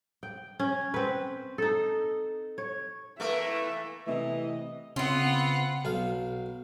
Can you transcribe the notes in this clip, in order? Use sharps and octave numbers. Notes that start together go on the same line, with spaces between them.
G5
C#4
C4 B4
D#4 A4
C#5
E3 A3 A#3 E5
C3 E3 A3 D#5
C#3 B3 C4 F4 F#5
B1 F5